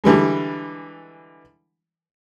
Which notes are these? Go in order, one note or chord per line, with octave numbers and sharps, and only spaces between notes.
D3 E3 G3 G#3